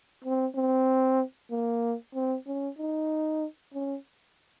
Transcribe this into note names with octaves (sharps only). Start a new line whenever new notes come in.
C4
C4
A#3
C4
C#4
D#4
C#4